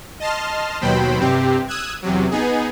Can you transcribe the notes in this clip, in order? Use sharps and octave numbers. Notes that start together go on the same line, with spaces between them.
D#5 A5 C6 F6
D#2 B2 F#3 C5 G5 B5
G2 C3 C4 G4
D#6 E6 F#6 G#6
E2 C3 F#3
B3 D#4 G#4